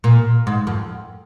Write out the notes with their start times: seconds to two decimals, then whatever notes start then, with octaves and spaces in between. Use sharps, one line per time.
0.04 A#2
0.47 G#2
0.67 F2